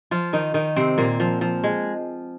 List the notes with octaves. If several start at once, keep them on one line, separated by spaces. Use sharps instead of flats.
F3 F4
D#3 D#4
D#3 D#4
C3 C4
A#2 A#3
F3
F3
G#3